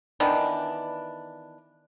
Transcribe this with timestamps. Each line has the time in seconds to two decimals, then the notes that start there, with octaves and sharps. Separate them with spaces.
0.20 D#3 E3 B3 D4